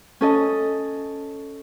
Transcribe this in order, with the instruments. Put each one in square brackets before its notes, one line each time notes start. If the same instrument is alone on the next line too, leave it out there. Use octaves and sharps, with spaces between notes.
[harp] C#4 A4 D#5